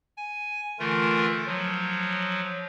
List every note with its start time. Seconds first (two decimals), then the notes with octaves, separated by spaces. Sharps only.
0.17 G#5
0.79 D3 E3 A3 F4 A#4
1.47 F3 F#3